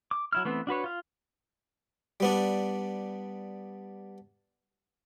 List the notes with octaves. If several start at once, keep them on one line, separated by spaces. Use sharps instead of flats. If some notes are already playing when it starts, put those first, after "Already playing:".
D6
F#3 E4 F6
E3 A3 B3 C4
D4 F#4 B4 C#5
F4 F5
G3 B3 D4